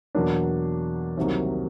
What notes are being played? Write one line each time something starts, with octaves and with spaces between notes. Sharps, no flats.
E2 B2 F#3 A#3 D4
C2 C3 D#3 F#3 A#3